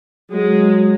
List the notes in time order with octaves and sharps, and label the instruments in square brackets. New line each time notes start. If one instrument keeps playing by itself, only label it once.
[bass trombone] F#3 [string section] G#3